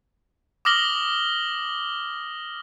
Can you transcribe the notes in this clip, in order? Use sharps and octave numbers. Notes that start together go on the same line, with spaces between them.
D6 D#6 F6 A#6 F#7 G7